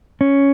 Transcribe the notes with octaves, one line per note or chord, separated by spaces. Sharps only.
C#4